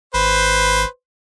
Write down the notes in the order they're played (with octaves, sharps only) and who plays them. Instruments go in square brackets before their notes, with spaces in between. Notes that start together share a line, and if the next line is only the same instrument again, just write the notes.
[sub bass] G#1 [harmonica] B4 C5